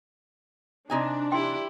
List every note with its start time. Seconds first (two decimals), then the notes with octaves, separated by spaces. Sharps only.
0.90 C3 D4 D#4 G#5
1.32 E4 G4 G5 C6